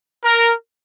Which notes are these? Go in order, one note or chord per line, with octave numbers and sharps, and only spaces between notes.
A#4